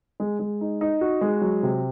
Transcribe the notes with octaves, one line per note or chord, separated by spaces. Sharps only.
G#3
G#3
D#4
D#4
F#4
G#3
F#3
C3